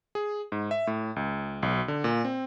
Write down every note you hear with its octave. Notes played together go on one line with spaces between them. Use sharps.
G#4
G#2
E5
A2
C#2
B1
D3
A#2
C4